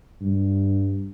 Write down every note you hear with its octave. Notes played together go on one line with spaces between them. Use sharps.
G2